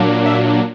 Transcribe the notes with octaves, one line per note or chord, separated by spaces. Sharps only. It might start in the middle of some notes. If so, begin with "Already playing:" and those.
Already playing: A#2 F#3 A#3 D4
E5